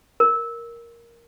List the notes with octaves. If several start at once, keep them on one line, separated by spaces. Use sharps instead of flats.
A#4